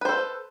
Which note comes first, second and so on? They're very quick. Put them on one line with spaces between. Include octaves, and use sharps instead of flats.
B4 C5 A4